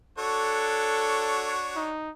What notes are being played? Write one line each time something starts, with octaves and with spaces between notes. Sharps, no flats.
D4 F#4 A4 C#5
D#4